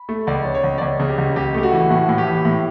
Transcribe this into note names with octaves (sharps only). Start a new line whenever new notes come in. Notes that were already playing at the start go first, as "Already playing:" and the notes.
Already playing: B5
A3
C#2 D5
C#4
C#5
C#2
D5
C#2 C#5
C#3
G4
C#2
C#2 G4
A3 G4
F#4
E3
A2 F#4
A2
G4
E3
A2